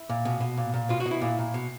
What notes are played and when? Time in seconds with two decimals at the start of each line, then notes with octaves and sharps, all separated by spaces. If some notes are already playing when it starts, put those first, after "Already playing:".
Already playing: E4
0.09 A#2
0.25 B2
0.41 B2
0.58 A#2
0.74 A#2
0.89 B2 F4
1.00 F#4
1.06 B2
1.11 E4
1.21 A#2
1.39 A#2
1.54 B2